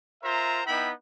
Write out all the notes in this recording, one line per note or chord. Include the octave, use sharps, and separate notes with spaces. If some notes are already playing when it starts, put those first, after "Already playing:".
F4 A#4 C5 E5 A#5
B3 D#4 E4 G5 B5